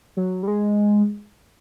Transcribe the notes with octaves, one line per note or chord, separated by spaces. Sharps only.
F#3
G3
G#3